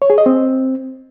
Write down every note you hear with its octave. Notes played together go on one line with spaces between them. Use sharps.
C#5
G#4
D#5
C4